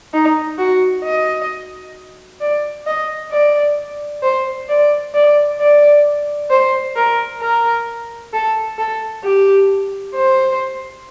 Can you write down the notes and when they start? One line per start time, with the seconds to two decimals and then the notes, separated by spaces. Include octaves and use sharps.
0.13 D#4
0.58 F#4
1.04 D#5
2.41 D5
2.86 D#5
3.31 D5
4.23 C5
4.69 D5
5.14 D5
5.60 D5
6.50 C5
6.96 A#4
7.41 A#4
8.33 A4
8.78 A4
9.24 G4
10.15 C5